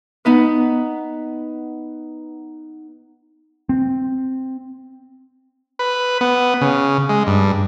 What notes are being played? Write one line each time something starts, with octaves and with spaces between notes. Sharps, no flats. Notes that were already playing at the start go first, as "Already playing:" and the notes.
B3 D#4 B4
C4
B4
B3
C#3
G#3
G2